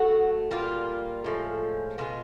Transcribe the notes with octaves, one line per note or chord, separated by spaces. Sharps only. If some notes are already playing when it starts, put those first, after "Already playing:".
Already playing: A2 F#3 A3 F#4
A#2 G3 A#3 F4
A2 F3 G#3
B2 G#3 F4